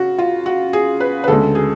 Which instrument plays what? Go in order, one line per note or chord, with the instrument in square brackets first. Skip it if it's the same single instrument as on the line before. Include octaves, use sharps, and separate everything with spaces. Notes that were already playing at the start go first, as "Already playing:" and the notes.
Already playing: [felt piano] C#3 F#4
F4
F#4
G#4
B4
B4
D2 C#3 G#3 A4
G#4